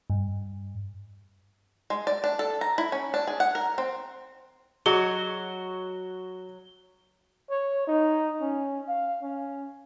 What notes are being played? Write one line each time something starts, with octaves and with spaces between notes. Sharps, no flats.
G2
G#3
D5
D4
A4
A#5
E4
C#4
D4
G#4
F#5
A#4
C4
F#3 F#4 G#4 C#5 D#5 C#6 G7
C#5
D#4
C#4
F5
C#4